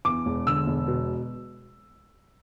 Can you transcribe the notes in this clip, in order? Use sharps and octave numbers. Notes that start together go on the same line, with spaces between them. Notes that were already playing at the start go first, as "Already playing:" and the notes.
E2 D6
E1
D3 E6
E1
B2